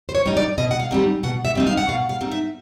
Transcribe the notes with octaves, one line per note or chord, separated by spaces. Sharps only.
C5
C#5
G3 C4 D#4
D5
B2 D#5
F#5
F5
G3 C4 D#4
B2 F#5
E5
G3 C4 D#4
F5
F#5
B2 F5
F5
G3 C4 D#4
E5